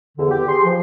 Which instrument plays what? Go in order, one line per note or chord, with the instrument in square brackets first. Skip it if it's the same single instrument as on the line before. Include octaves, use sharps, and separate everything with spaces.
[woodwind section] E2 D3
G4
G#4 C6
F3